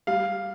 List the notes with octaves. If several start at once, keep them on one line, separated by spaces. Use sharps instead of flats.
G3 F5